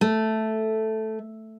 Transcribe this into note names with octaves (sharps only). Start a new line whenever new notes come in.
A3